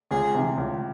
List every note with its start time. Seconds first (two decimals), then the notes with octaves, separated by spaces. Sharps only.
0.11 C#2 G#4
0.34 C3 E3
0.58 C#2